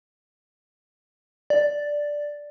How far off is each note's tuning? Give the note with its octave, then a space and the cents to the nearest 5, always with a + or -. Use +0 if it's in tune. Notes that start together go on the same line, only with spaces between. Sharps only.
D5 +0